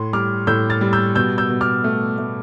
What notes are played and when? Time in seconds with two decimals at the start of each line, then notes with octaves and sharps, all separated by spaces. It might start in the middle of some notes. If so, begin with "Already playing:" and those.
Already playing: A2 C6
0.13 G3 D6 F6
0.47 A2 E6 G6
0.70 F6 A6
0.81 G3
0.93 E6 G6
1.15 B2 E6 G6
1.38 E6 G6
1.50 B2
1.61 D6 F6
1.84 A3
2.18 A3